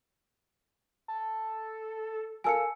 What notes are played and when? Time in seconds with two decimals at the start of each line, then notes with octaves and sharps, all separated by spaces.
1.08 A4
2.44 A4 A#4 F5 G#5 E6 C#7